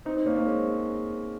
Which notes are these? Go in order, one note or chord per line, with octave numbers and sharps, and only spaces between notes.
C4 D#4
C4 D#4
A#3 C#4
A#3 C#4
G#3 C4